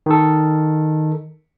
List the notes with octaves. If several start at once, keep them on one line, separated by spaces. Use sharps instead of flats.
D#3 A4